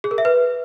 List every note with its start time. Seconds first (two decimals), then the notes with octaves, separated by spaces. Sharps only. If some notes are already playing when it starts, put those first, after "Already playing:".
0.04 G#4
0.11 A#4
0.18 E5
0.25 B4